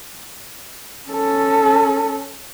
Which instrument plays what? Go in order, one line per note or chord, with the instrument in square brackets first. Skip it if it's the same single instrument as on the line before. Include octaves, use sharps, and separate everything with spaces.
[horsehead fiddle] C#4 A4